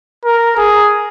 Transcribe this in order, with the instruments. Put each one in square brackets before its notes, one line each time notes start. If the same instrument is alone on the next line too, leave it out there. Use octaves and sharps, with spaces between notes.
[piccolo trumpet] A#4
G#4